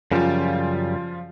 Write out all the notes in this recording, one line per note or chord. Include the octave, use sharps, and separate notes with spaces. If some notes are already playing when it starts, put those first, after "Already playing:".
F#2 C#3 F3 G3 F4